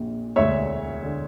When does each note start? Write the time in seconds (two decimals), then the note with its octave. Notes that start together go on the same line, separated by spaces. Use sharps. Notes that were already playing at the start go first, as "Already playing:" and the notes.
Already playing: A#1 A#2
0.36 E1 D2 D3 C#5 E5
1.02 D3